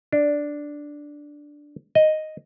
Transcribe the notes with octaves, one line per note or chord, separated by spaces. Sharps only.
D4
D#5